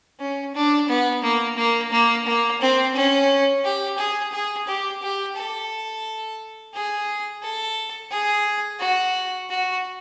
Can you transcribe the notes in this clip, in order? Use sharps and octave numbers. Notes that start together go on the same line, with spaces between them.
C#4
D4
B3
A#3
A#3
A#3
A#3
C4
C#4
G4
G#4
G#4
G4
G4
A4
G#4
A4
G#4
F#4
F#4